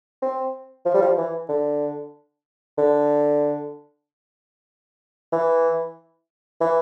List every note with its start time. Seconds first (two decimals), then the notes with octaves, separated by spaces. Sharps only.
0.22 C4
0.85 F3
0.94 G3
1.02 F3
1.17 E3
1.49 D3
2.78 D3
5.32 E3
6.61 E3